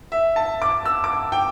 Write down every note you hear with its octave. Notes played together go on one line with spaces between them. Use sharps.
E5
A5
D6
E6
D6
G5